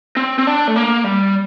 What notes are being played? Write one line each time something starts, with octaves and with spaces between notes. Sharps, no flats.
C4
C4
D4
A3
A#3
G3